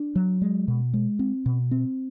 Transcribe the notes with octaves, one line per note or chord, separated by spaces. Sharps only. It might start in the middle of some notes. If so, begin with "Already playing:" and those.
Already playing: D4
F#3
G#3
B2
G#3
C4
B2
C4